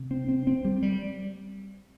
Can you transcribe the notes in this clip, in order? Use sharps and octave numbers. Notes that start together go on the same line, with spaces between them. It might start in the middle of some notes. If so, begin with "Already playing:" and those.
Already playing: C3
C4
C4
C4
G3
G3